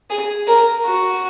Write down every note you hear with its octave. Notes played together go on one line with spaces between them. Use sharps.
G#4
A#4
F#4